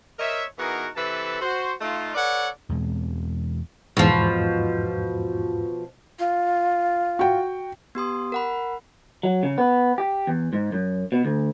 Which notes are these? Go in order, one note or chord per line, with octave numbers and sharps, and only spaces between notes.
A#4 C5 C#5 D#5 E5
E3 B3 D#4 F#4 G#4 A#4
C3 E3 A4 B4 E5 A5
F#4 C5
A3 D#4 F4
A4 B4 C#5 D5 F#5
E2 B2 G#3 C4
E2 G#2 B2 F3
F4
F#4 G5
B3 G4 C6 D#6
A#4 F#5 B5
F#3
C#3
B3
G4
E2
G#2
F#2
B2
D2